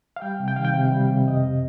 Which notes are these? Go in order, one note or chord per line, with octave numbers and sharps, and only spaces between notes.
F5
G3 G5
C3
G5
D#3 F5
G5
C3
G3
C3
F2 D#5